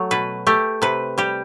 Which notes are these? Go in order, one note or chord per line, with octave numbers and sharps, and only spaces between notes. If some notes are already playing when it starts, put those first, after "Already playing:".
Already playing: F#3 A3
B2 B4
A3 G4
C3 B4
G3 G4